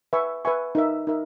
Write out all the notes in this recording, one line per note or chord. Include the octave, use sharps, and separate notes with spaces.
B4 E5 G#5 C#6
B4 E5 G#5 C#6
D#4 A#4 E5
D#4 A#4 E5